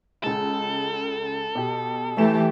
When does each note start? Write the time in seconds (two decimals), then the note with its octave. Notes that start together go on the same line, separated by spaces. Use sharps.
0.24 C#2 G#3 A4
1.55 B2 G4
2.17 E3 A3 G4 E5 G#5 E7